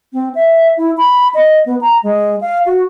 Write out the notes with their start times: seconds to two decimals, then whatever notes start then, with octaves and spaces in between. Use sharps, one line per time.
0.13 C4
0.35 E5
0.77 E4
0.97 B5
1.34 D#5
1.66 B3
1.81 A#5
2.03 G#3
2.41 F5
2.66 F#4